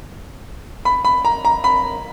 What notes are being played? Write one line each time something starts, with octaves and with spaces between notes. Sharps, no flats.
B5
B5
A#5
A#5
B5